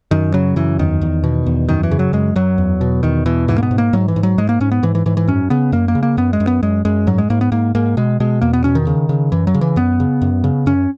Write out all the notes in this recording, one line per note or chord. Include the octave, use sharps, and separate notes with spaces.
F#2 D#3
C#3 F#3
F#2 E3
E2 D#3
E2
B2
E2
F#2 D#3
E3
C#3
F#3
F#2 G#3
F#2 F#3
E2
B2
E2 D#3
B2 E3
G#2 E3
A#3
B3
G#2
A#3
G#2 F#3
E3
G#2
F#3
G#2 G#3
A#3
G#2 C#4
B3
G#2 E3
E3
G#2 E3
E3
F#2 C#4
C#3 B3
F#2 A#3
A#3
C#3
A#3
F#2 B3
G#3
F#2
B3
F#2 G#3
F#2 G#3
G#2 F#3
G#3
G#2 A#3
B3
G#2 A#3
G#2 A#3
B2 G#3
B2 G#3
E2 A#3
B3
B2 C#4
D#3
C#3
C#3
F#2 E3
F#3
C#3
E3
F#2 B3
C#3
F#2
C#3
F#2 C#4